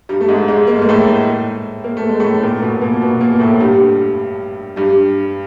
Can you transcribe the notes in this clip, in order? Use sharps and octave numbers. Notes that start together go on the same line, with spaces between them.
G2 G3
A3
G#2 G#3
G#2 G#3
A#3
A3
G#3
A2 A3
A#3
A3
G#3
A2 A3
A#2 A#3
B2 B3
A#2 A#3
B2 B3
A#2 A#3
A2 A3
G2 G3
G2 G3